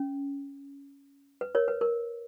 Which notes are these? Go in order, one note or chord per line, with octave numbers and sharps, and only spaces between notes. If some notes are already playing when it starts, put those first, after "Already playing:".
Already playing: C#4
B4
A#4 C#5
B4
A#4